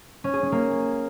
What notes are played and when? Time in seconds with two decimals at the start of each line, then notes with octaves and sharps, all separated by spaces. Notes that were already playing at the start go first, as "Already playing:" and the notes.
0.24 C#4
0.33 G#4
0.43 C#4
0.52 A#3